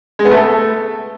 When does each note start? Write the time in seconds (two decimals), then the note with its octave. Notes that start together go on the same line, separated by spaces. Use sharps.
0.19 G#3
0.25 B3
0.31 A3
0.37 A4